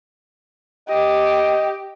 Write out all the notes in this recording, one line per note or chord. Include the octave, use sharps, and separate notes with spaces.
G4 D#5